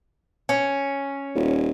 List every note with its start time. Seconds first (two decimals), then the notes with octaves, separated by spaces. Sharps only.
0.49 C#4
1.35 D#1